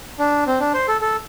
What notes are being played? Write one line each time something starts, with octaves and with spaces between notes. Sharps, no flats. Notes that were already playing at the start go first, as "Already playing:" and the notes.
D4
C4
D4
C5
A4
A4